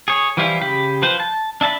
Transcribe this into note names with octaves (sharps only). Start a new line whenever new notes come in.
G#4 C#5
E3 F3 G3 E4 F4
C#3 G4 B5
F3 B4 C5
A5
D4 E5 A5 B5